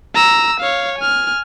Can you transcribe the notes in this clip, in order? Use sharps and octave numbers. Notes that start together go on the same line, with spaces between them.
A#5 E6
C#5 F5
G#5 F6